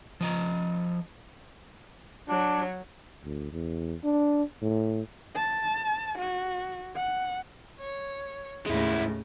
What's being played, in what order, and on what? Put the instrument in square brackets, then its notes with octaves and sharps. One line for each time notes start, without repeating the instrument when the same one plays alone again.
[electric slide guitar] F3 D#5 A#5
[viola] F#3 [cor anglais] D4
[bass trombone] D2
E2
D4
A2
[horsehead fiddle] A5
F#4
F#5
[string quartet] C#5
[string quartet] D#2 A2 C#3 [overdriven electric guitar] G#3 E4